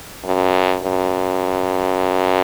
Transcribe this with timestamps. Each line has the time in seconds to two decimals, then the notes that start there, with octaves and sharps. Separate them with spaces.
0.25 F#2
0.84 F#2